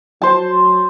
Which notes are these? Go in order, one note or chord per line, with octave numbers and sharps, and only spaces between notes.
F#3 C5 A5